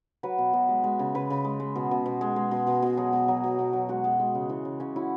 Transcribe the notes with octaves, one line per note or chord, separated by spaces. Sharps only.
F#3 B4
B2
B2
G#3
G#3
C#3
C#3 B4
C#3
G#3
G#3
B2
B2
B2
G#3
G#3
B2
B2
B2
F#3 G#4
B2
F#3
B2
B2
F#3
G#3 F#4
G#3
G#3
C#3
E3
C#3
C#3 C#4
F#3 E4